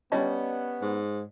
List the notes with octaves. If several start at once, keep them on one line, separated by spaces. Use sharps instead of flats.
G3 B3 C#4 C#5 D#5 A5
G#2